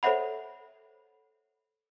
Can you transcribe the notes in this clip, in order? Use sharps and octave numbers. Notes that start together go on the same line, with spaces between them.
A4 C5 C#5 E5 F#5 B5